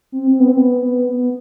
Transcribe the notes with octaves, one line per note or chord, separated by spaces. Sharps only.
C4
C4
B3
C4
B3
B3
B3